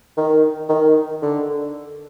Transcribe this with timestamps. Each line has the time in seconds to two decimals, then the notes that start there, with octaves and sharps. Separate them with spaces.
0.17 D#3
0.69 D#3
1.22 D3